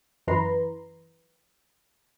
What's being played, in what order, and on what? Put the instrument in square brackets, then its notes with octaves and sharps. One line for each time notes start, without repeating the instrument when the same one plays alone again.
[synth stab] F#2 E3 B4 A#5 C6